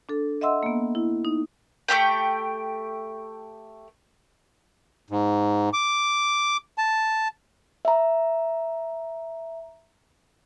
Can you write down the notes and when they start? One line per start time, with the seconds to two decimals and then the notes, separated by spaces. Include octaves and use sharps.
0.09 D4 A4
0.41 D#5 E5 F#5 C6 E6
0.63 A#3 B3
0.95 E4
1.25 D#4
1.88 A3 C#4 G4 G5
5.10 G#2
5.73 D6
6.78 A5
7.85 E5 A#5